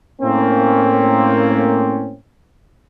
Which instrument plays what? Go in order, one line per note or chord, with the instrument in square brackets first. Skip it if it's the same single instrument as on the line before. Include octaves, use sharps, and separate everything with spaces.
[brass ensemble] A2 A#3 C4 C#4